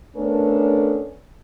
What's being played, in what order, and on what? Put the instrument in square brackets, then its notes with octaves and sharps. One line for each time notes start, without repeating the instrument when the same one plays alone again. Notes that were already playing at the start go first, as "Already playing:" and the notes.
[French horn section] A3 B3 C#4 D4 A4 A#4